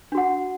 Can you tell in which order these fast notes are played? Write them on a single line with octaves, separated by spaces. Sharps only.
D4 F#4 F#5